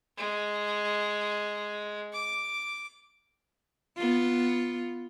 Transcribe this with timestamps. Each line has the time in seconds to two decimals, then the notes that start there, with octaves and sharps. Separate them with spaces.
0.17 G#3
2.13 D6
3.97 B3 F4